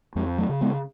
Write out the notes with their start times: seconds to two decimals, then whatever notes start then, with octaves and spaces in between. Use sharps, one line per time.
0.15 F2 F3 G#3
0.38 F#3 A3
0.49 C#3
0.61 G#3 B3